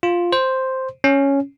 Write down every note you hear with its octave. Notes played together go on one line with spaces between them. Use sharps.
F4
C5
C#4